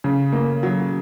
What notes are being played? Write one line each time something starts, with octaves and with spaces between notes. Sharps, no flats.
C#3
A#3
F#3